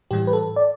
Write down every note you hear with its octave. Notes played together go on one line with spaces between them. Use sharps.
A2 E3 G3 G4
B4
A4
D5